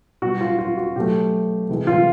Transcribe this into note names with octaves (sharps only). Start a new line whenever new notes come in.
B2 G3 F#4
F4
F4
F#4
B2 F#3 A3 G4
C3 E3 G#3
F4